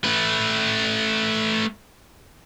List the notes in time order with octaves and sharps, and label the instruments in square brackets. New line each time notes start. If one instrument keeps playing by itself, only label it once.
[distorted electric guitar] A3 B4